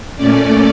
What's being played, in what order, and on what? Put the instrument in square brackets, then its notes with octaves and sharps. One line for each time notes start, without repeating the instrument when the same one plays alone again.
[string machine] A#2 A3 C#4 D5